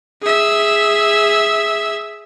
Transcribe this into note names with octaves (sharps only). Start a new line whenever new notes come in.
G#4 E5